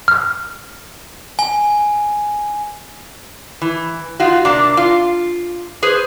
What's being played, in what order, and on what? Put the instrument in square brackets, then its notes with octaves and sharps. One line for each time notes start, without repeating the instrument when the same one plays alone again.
[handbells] F6
[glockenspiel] G#5
[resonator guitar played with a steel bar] E3
D#4 F4 F#4
C3 A#3 D4
F4
G#4 B4 C5